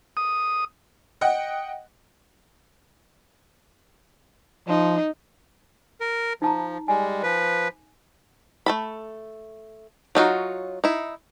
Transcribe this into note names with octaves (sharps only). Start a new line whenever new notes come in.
D#6
D#5 F#5 G5
F3 D#4
A#4
F3 D#4 A5 A#5
G3 G#3 G#5
F3 B4
A3 A4 B5
F#3 D#4 F4 F#4
D#4 E4